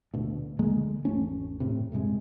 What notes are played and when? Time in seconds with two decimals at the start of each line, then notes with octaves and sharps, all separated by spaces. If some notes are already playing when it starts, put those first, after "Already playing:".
0.14 D2 B2
0.59 D2 D3 G#3 A#3
1.05 G#1 E2 A3 C#4
1.60 F#1 A2 C3
1.92 B1 G2 C3 G#3